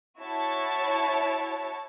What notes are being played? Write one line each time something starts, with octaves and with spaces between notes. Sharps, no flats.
E4 F#4 C#5 A5